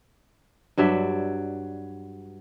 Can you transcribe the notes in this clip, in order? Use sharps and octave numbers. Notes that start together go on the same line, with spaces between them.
G2 F#3 D5 E5